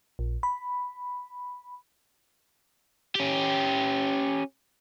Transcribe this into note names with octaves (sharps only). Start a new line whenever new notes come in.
A#1
B5
C#4 G4